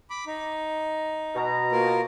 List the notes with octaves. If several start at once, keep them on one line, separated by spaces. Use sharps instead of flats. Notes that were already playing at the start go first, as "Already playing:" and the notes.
B5 D6
D#4
B2 A#5
A#3 F4 A#4